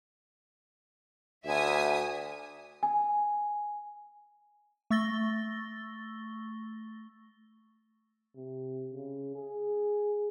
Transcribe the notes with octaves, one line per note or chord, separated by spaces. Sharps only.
D2 E5 G#5 D#6
G#5
A3 C#6 E6 A6 A#6 G7
C3
C#3
G#4